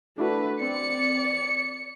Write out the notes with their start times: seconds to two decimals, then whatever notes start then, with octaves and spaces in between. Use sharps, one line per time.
0.18 A3 D4 E4 F#4 B4
0.61 C4 D5 C#7